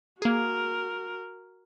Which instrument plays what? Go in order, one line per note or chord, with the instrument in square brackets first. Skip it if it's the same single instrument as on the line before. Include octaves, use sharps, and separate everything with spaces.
[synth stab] A#3 G#4 [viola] F#4 A#4